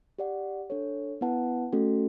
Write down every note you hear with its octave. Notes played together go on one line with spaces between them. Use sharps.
G4 D5 F#5
D4 A4 C#5
B3 E4 B4 F#5 A5
A3 C#4 F#4 A4